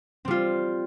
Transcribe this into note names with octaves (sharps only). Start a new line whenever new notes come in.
G3 C4 F4